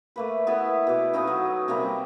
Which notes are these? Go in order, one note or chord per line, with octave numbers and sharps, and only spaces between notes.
A3 A#3 B4
B3 E4 A4 B4
B2 D6
C#4 D#4 B4 F5
F#3
C3 G3 A#3 A#5